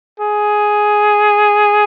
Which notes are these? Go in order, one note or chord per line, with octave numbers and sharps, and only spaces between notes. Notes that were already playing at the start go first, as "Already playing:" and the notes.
G#4